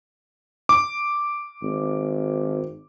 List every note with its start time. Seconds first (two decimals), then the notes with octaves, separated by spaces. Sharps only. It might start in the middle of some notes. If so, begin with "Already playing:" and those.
0.69 D6
1.63 G#1